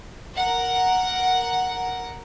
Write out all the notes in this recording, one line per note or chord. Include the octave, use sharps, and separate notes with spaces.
A#4 F#5